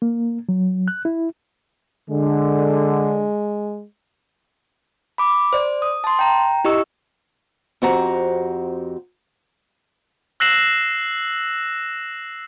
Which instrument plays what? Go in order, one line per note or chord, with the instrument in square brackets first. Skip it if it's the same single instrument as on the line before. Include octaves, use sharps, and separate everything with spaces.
[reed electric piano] A#3
F#3
F#6
E4
[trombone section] D3 [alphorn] G#3
[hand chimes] B5 D6
C5 D5
D#6
A5 C6
G5 A#5
E4 G4 D#5 C#6 E6
[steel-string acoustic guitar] F2 C4 F#4 G4 F#5 A#5
[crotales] E6 F#6 A#6 C7 E7 F#7